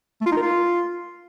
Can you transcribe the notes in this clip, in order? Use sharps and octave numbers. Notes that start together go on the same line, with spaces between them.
A3
F4
D#4
A#4
F4